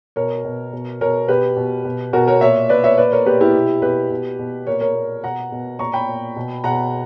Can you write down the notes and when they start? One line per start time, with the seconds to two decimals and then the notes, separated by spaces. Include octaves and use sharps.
0.16 B2 A#4 C#5
0.45 B2
0.73 B2
1.01 B2 A#4 C#5
1.28 B2 G4 B4
1.57 B2
1.85 B2
2.13 B2 F#4 A#4
2.28 A#4 C#5
2.41 A#2 C#5 E5
2.69 A#2 B4 D5
2.84 C#5 E5
2.98 A#2 B4 D5
3.12 A#4 C#5
3.26 A#2 G4 B4
3.41 E4 G4
3.55 B2
3.82 B2 G4 B4
4.10 B2
4.39 B2
4.67 A#2 A#4 C#5
4.81 A#4 C#5
4.95 A#2
5.24 B2 F#5 A#5
5.52 B2
5.79 A#2 A#5 C#6
5.93 G5 B5
6.09 A#2
6.36 B2
6.64 B2 F#5 A#5